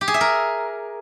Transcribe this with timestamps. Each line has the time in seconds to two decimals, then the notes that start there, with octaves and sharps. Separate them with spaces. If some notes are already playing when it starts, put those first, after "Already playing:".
0.01 G4
0.08 G#4
0.14 E5
0.21 A#4